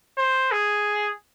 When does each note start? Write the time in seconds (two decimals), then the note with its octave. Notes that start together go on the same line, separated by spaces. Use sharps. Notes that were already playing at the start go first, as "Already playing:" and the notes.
0.18 C5
0.51 G#4